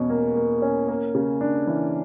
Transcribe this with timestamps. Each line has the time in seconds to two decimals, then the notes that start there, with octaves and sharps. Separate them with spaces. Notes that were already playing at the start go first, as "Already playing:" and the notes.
Already playing: E2 B2 C#4
0.10 A#3
0.36 A#3
0.62 C#4
0.88 A#3
1.15 C#3
1.41 D4
1.67 E3